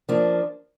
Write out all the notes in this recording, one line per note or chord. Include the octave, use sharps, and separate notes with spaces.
F3 A#3 D4